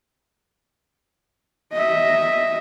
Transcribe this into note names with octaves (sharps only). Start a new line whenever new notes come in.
D#5 E5